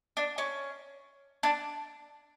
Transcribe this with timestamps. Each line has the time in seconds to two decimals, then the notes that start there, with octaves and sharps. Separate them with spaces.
0.17 D4
0.38 C#4
1.43 D4